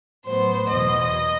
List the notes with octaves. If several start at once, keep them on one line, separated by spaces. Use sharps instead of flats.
A2 F#3 B3 C5
E2 B2 F#3 D#5